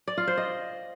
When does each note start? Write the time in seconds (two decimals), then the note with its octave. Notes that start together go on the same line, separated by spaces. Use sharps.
0.07 D5
0.17 F4
0.27 C5
0.37 D#5